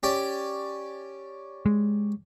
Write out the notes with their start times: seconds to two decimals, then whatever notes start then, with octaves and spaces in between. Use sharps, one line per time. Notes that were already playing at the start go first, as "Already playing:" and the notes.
0.03 C#4 G4 D5
1.66 G#3